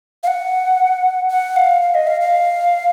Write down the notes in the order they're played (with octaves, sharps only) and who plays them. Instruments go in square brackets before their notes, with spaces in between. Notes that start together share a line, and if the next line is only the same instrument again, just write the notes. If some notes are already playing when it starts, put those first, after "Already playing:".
[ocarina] F5
F#5
F#5
F5
F5
D#5
F5
F5